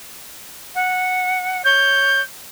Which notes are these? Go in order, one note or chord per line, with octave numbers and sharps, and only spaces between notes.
F#5
C#5 G6